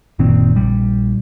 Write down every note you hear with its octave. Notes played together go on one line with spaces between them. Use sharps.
F#1 A#2 D#3 C4
A#1 G3